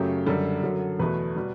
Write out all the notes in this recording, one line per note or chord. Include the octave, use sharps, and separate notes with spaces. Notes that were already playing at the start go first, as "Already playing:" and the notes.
Already playing: F#2 C#3 F#3 A3 G4
F#2 D3 G3 A4
F#2 D3 F#3
E2 B2 A3 B4
B2 G3